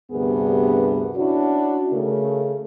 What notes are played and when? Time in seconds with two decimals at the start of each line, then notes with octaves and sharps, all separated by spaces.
0.11 D2 G2 C3 B3 G#4 A#4
1.16 C#4 D4 E4 F#4
1.91 C#3 A3 A#4